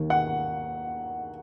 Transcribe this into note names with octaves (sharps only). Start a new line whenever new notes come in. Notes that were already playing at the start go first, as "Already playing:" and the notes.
Already playing: D#2 D#3 A#3
F#5